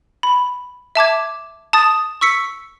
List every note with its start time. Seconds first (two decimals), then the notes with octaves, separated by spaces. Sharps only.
0.23 B5
0.95 E5 A5 D6 G#6
1.73 A5 D#6 A6
2.21 C#6 E6 B6 C#7